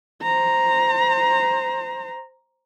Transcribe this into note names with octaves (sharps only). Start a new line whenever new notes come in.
C5 A#5